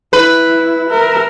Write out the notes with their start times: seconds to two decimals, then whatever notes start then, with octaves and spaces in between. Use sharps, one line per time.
0.13 E4 B4
0.90 A#4 E5